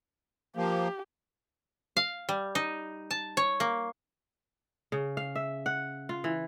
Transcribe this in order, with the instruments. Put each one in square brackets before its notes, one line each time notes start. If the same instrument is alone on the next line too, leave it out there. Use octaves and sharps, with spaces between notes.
[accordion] F3 A#3 [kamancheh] G4
[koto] F5
G3
D#4
A5
C#5
A#3
[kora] C#3
F5
E5
F#5
F4
E3